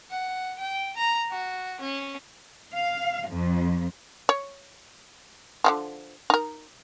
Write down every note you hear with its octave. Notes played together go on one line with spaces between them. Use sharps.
F#5
G5
A#5
F#4
C#4
F5
F2
C#5
D3 E3 F3
D#4 A#4